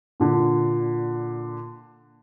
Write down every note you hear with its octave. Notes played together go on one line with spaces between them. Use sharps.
A#2 D3